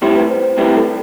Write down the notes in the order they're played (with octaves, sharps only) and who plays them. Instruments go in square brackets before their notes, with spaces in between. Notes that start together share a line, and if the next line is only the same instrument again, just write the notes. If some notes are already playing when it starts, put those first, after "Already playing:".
[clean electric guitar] A2 G3 C4 E4 [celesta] G4
[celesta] B4
C5
C5
[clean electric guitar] A2 G3 C4 E4 [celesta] B4
[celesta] A4